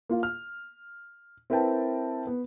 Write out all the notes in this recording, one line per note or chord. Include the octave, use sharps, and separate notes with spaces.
A#3 F4 F5
F6
C4 E4 A#4 B4 G5 A5
B3